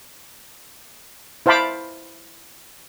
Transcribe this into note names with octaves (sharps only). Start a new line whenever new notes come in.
E4 C5 F5 A5 B5 D6